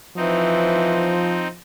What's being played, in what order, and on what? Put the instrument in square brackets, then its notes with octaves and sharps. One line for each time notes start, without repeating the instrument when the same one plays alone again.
[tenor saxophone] E3 [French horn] F3 [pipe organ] C4 D#4